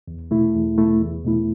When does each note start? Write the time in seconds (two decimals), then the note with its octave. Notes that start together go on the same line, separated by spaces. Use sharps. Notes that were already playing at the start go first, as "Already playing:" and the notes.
0.08 E2
0.31 B2 A3 E4
0.55 E2
0.78 B2 A3 E4
1.01 E2
1.25 B2 A3 E4